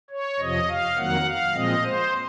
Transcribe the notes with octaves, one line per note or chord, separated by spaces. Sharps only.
C#5
F2 C3 F3 D#5
F5
F2 D#3 F#3 A#3 F#5
F5
A#2 F3 G#3 C4 D#5
C5